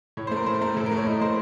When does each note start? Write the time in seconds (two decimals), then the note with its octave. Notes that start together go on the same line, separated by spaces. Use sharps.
0.17 A2 C#5
0.27 C5
0.31 A3
0.36 A#4
0.46 A2 C5
0.61 A3 A#4
0.77 A2 A4
0.86 A#4
0.91 A3
0.97 C#5
1.06 A2 D#5
1.21 A3 C5